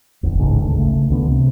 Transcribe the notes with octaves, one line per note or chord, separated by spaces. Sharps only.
D1 G1 E2
D1 A1 G#2 C#3
G#1 D2 D3
C#3 A3
C#2 D3 B3
C3